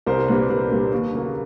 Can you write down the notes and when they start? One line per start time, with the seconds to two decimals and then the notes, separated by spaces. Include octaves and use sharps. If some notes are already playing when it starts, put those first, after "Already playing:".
0.06 C2 A#4 C5
0.28 A#2 G3 A#3 D4 B4
0.49 C2 B4
0.70 A#2 G3 A#3 D4
0.92 D#2
1.13 C#3 F#3 A#3